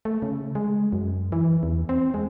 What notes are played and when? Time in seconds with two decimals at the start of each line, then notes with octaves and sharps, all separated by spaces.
0.05 A3
0.22 C#3
0.55 G#3
0.93 F#2
1.32 E3
1.63 E2
1.89 C4
2.14 G#3